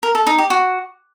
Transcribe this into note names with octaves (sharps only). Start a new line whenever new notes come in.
A#4
A4
D#4
G4
F#4